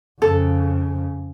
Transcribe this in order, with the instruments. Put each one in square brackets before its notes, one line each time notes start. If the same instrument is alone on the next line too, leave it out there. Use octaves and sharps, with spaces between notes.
[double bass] F2 C#3 [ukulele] A4